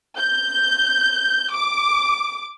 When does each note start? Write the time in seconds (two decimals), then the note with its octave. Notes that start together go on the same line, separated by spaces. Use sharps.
0.17 G6
1.53 D6